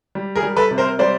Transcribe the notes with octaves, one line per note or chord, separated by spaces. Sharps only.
G3
G#4 A#4
G3
A4 B4
C3
A#4 C5
G3 C5 D5